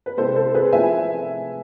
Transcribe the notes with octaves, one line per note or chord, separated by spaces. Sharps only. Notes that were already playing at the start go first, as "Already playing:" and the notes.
B4
C3 G#3 C4 E4 A4 C5
A4 C5
G#4 B4
F3 A3 C4 E4 E5 G#5